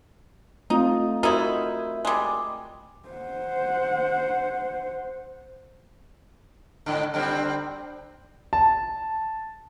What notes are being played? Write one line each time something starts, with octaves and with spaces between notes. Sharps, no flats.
A3 C4 D#4 F4
D#4 E4 F#4 A#4 C5
G3 G#3
C5 F#5
G#2 D3
D3 G3 C4
A5